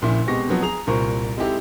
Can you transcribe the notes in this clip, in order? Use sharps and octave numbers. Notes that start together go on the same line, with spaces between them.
A#1 A#2 C#3 E4
B2 G#3 C4 G4 C#6 A#6
F3 F#3 B3 C4
G#4 A#5 F7
C2 A#2 F4 A#4 C5 C#6
G#3 C4 D#4 E4 G4 A4